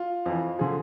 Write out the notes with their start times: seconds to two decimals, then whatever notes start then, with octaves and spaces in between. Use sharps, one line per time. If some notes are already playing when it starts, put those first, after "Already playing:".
Already playing: F4
0.26 F2 E3
0.58 D3 F3 G#4